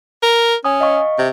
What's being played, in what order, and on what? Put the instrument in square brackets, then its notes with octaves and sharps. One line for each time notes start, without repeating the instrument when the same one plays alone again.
[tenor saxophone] A#4
[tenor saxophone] C#4 [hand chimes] G#5 D#6
[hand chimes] D#5 F5 C#6
[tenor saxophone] C3